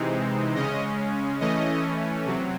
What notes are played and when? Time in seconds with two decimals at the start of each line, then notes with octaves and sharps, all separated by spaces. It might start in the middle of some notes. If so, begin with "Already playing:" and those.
Already playing: C3 E3 G#3 C4 D#4
0.55 C#3 G#3 C#4 D#5
1.41 E3 A3 C#4 D#5
2.26 C3 F#3